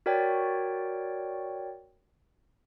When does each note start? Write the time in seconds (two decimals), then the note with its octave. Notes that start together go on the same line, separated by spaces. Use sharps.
0.06 F#4 A#4 C#5 D5 G5